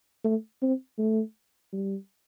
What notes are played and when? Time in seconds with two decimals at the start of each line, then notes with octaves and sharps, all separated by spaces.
0.24 A3
0.62 C4
0.98 A3
1.72 G3